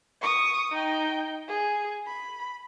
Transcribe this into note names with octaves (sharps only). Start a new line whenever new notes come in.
C#6 D#6
D#4 G5
G#4
B5